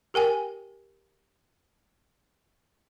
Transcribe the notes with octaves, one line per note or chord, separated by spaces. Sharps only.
G4 A#4 G5 G#5